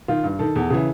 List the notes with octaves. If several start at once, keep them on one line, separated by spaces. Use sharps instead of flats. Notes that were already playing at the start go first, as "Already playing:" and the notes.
D#3 F4
G2
D#3 A4
E2
C#3 E3